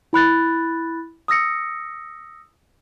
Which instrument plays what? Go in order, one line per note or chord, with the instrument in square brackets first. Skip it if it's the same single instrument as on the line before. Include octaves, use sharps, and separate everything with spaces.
[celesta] E4 B5 F#6 A6
D#6 E6 A#6 C#7